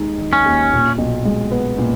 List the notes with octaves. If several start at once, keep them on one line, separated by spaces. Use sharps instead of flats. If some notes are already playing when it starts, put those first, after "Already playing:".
Already playing: D#2 G#3 D#4
D#3
C#4
D#2
A#2
B1
G#3
B3
A#2